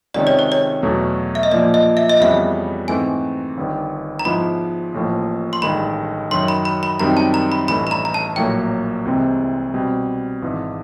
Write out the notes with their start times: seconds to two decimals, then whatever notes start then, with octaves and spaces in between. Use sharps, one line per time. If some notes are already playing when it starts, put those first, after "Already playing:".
0.14 C#2 C3 D#3 G#3 C#4 D5
0.27 C#5
0.39 C5
0.52 C#5
0.83 E2 B2 F#3 A3
1.35 E5
1.43 D#5
1.51 A#2 F3 A#3 D5
1.74 D#5
1.97 E5
2.09 D#5
2.20 F2 C#3 E3 G3 B3 E5
2.88 G#2 E3 A3 C4 G#5
3.57 G1 G2 D#3
4.19 A#5
4.25 G#2 F3 G#3 B3 E4 B5
4.94 A1 A2 F3 A#3
5.53 C6
5.62 A1 G2 D#3 G#3 B5
6.31 F#2 D#3 F#3 C6
6.48 B5
6.65 B5
6.83 B5
7.00 F#2 D#3 G3 C4 D#4 A#5
7.17 A5
7.34 A#5
7.52 B5
7.68 A1 G2 E3 A3 B5
7.87 B5
7.91 A#5
8.05 A#5
8.14 A5
8.36 A#1 A2 F#3 A#3 G5
9.05 C2 C3 E3 G#3 C4
9.74 B2 G3 C4
10.42 G#1 G#2 E3